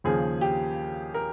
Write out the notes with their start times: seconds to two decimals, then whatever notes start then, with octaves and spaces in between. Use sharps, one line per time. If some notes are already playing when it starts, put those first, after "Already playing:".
0.04 D#2 C#3 F3 A#3 G#4
0.41 G4
1.14 A#4